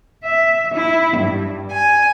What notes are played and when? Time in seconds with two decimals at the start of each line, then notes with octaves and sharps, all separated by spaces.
0.24 E5
0.75 E4
1.18 G2
1.73 G#5